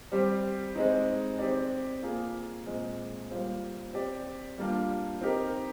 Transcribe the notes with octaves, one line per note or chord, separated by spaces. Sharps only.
G3 C4 G4 C5
G#3 C4 D#4
C4 G4 D5
A#3 F4 G#4
A#2 G#3 C4
G3 A#3 F4 C5
C4 G4 D5
G3 A#3 D4 F4
C4 D#4 G4 A#4